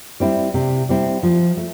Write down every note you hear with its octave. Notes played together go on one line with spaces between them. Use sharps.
G3 C4 E4
C3
G3 C4 E4
F3
A3